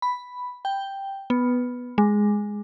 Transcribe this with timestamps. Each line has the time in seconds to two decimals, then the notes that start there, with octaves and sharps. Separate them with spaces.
0.02 B5
0.65 G5
1.30 B3
1.98 G#3